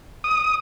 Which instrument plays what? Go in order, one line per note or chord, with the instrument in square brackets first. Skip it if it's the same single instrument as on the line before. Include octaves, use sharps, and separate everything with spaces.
[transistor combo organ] D#6